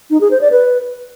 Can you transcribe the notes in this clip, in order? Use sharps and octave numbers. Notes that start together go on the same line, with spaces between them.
D#4
G#4
C5
D5
B4